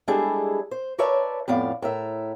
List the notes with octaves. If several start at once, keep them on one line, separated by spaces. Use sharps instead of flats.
G3 G#3 D4 E4 G#4 A4
C5
A#4 B4 C#5 D5 E5 A5
F2 A2 B3 D5 F5
A2 A#4 E5